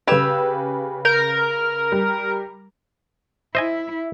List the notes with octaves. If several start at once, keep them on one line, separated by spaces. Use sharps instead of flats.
C#3 G4 B4 G#5 E6
A#4 G6
G3
E4 C5 D#5 E5 G#5